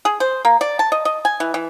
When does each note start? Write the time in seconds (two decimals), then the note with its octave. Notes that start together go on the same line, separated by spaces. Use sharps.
0.05 G#4
0.20 C5
0.45 A#3
0.61 D5
0.79 A5
0.92 D#5
1.05 D#5
1.25 G#5
1.40 E3
1.54 E3